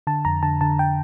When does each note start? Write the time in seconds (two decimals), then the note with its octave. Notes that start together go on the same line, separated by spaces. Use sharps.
0.07 D3 A5
0.25 F2 A#5
0.43 D3 A5
0.61 D3 A5
0.79 G5